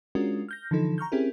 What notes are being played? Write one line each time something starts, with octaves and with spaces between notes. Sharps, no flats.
G#3 C#4 D4 F4 F#4 A#4
F6 G6 A#6
D3 E3 F3 D#4 A4
A#5 C#6 F6 G6
C4 C#4 E4 G4 G#4 A#4